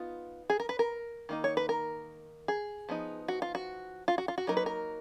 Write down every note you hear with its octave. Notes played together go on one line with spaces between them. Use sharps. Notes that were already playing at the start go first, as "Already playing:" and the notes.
Already playing: B3 D#4 F4
G#4
A#4
B4
A#4
D#3 A#3 D#4
C#5
B4
A#4
G#4
F3 B3 D#4
F#4
F4
F#4
F4
F#4
F4
F#4
F#3 A#3 D#4 A#4
B4
A#4